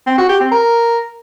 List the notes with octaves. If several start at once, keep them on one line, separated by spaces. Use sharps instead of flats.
C4
F#4
G4
C4
A#4